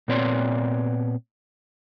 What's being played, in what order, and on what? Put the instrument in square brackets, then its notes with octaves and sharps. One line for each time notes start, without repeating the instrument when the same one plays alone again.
[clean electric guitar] A#2 B3 C4 C#5 D5 C6